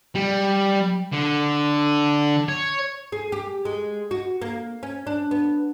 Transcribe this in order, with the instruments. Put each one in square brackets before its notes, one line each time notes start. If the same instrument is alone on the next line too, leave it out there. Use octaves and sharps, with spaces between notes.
[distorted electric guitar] G3
D3
C#5
[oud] G#4
G4
G#3
F#4
A#3
C#4
D4
B3